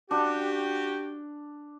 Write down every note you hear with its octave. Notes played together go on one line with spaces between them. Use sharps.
D4 F#4 G4